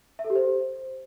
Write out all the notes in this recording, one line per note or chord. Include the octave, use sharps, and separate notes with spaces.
E5
A4
G4
C5